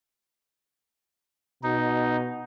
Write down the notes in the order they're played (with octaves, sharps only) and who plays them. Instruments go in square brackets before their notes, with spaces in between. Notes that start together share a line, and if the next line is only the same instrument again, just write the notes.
[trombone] B2 [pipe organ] D#4